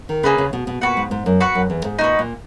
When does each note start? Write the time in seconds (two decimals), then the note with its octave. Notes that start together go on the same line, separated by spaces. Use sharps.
0.09 D#3
0.23 C#3 A#3 C#4 G#4 B4
0.38 C#3
0.53 B2
0.67 B2
0.81 A#2 F#4 B4 F#5
0.97 G#2
1.11 G#2
1.26 F#2
1.40 F#4 B4 F#5
1.55 F#2
1.70 E2
1.84 G#2
1.99 A#2 D#4 F#4 B4
2.19 A#2